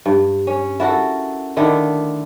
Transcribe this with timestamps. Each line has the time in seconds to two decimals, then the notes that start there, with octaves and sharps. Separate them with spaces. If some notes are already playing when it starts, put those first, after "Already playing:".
0.06 G2
0.47 C#4
0.80 E4 F#4 A4 A#4
1.57 D3 D#3 A3 E4